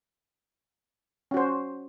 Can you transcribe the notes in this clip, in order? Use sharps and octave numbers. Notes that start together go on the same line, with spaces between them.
C#4 F#4 C5